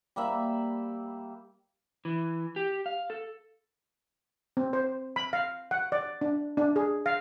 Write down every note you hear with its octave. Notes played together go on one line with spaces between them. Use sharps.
G3 A#3 E5 B5
E3
G4
F5
A4
C4
C5
B5
F5
F#5
D5
D4
D4
G#4
F5